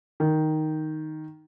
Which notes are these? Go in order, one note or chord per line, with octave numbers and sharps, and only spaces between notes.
D#3